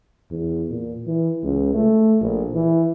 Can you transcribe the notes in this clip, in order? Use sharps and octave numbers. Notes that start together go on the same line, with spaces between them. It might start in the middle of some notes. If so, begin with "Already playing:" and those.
E2
A#2
E3
C#2
A3
A#1
E3